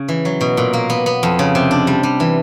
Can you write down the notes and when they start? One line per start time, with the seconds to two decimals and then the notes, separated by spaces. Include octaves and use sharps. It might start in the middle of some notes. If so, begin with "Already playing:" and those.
Already playing: C#3
0.09 E3
0.25 F#3
0.41 B2
0.57 A#2
0.73 A#3
0.90 B3
1.06 B3
1.23 F2
1.39 C#3
1.55 C3
1.71 D4
1.87 G3
2.03 G3
2.20 E3